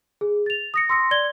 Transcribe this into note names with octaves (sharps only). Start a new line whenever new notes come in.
G#4
A6 F7
D#6 A#6 C#7
C6 E6 A#6 C#7
D5 G#6 G7